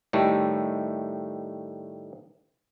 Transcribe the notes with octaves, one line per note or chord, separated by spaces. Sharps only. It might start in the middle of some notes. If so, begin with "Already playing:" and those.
A2 D#3 G3 A3